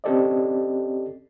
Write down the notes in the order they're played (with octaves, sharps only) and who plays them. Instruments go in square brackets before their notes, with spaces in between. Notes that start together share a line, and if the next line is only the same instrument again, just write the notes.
[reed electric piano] C4 C#4 G4 A4 D5 D#5